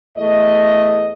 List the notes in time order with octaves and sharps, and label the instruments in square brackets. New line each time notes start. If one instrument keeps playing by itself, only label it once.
[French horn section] E2 A3 D#5